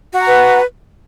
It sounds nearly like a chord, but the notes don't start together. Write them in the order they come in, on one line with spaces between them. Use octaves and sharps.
F#4 F#5 A#5 B4